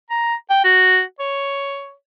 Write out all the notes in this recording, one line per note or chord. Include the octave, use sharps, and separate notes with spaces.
A#5
G5
F#4
C#5